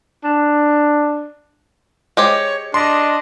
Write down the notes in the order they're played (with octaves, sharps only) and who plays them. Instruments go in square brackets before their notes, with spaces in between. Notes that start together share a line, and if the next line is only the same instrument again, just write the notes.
[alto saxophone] D4
[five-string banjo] G#3 G4 C5 [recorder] C#5
[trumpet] D4 [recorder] D#5 [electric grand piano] C6